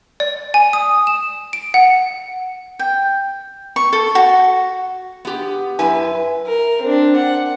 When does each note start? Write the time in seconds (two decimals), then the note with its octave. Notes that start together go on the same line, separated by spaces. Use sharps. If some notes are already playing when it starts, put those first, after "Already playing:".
0.20 D5
0.54 G#5
0.73 D#6
1.07 E7
1.53 D7
1.74 F#5
2.79 G5
3.76 C#6
3.93 A4
4.15 F#4
5.25 B3 G4
5.79 F#2 E4 B4 G#5
6.47 A#4
6.82 C4 D4
7.16 F#5